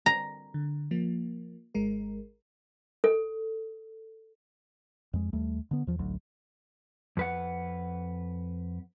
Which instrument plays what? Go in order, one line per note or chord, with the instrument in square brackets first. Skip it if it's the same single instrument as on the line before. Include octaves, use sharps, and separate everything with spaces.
[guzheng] A#5
[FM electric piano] D3
F3 A#3
G#1 G#3 A#4
[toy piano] A4
[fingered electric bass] F2 G#3
D#2 G3 A3
D3 B3
E2 F3
A1 D2 F#3
[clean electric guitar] F2 B4 F#5